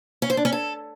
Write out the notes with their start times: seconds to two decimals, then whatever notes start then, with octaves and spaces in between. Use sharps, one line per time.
0.22 C#4
0.30 C5
0.37 D4
0.45 C#4
0.52 A4